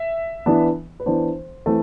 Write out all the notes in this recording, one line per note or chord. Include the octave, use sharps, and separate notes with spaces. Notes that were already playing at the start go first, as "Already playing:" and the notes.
Already playing: E5
E3 B3 D4
B4
E3 B3 D4 C5
E3 A3 C4